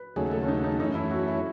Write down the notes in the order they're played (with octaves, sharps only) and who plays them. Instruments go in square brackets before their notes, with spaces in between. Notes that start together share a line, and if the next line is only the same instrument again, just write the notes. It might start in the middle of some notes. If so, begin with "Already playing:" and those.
Already playing: [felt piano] B4
[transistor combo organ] D#2 C#3 F#3 A3 [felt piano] G#4
[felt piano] A4
C#4
D#4
D#4
[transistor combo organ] F#2 E3 A3 C#4 [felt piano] D#4
[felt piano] E4
F#4
E4